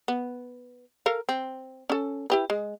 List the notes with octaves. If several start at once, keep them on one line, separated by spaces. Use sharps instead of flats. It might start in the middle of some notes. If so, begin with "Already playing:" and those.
B3
A4 A#4 F5
C4
C#4 A4
E4 G4 B4
G#3